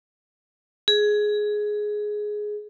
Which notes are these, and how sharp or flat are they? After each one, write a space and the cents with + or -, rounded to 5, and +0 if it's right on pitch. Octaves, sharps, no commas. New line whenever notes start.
G#4 +10